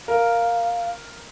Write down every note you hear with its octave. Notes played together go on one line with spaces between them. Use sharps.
A#4 F5